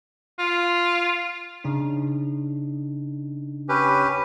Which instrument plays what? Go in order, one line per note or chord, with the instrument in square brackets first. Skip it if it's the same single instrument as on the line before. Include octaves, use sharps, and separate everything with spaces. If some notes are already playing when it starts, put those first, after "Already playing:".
[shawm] F4
[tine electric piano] C#3 D4 D#4
[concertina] C#4 G4 B4